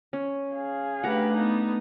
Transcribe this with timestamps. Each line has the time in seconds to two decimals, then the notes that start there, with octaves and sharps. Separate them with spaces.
0.13 C#4
0.53 G#4 F5
1.04 A3 D4 G4 B4 F#5 A#5
1.33 B3 D#4